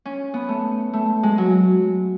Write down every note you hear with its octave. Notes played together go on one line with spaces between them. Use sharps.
C#4
B3
A3
A3
G#3
F#3